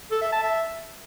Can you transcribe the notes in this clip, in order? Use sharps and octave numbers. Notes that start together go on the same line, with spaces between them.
A4
E5
A5
E5